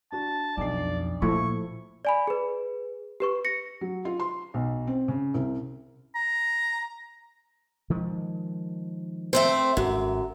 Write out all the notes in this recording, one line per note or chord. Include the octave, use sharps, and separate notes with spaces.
D4 F#4 A5
B1 F2 D4 D5 C7
A#2 F3 A3 E4 C#6
D5 G#5 B5
G#4 B4
G4 B4 C#6
A#6 C#7
F#3
F4
C6
B1
C4
C#3
C2
A#5
D#3 F3 G#3
A3 C4 C5
G#1 F#2